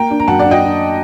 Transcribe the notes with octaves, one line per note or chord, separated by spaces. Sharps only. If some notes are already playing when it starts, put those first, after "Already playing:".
Already playing: A#3 G5 A#5
D4
A#5
F#2 F#5 A5
D5 F#5
D4
D#5 G5
D4